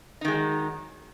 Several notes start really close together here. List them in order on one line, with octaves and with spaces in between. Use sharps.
D#4 D#3 G#3 F#3